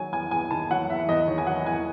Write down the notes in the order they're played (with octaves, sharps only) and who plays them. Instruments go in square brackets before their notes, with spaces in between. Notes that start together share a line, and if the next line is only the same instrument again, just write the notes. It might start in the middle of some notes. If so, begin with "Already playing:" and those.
Already playing: [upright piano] D#3 F#3 G#5
E2 G#5
E2 G#5
D#3 A5
F#3 F#5
E2 E5
E2 D#5
D#3 C#5
G#5
F#3 F#5
E2 G#5